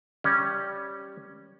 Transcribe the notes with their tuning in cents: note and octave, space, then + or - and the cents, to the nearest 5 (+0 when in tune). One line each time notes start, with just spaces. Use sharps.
G3 +0 C#4 +0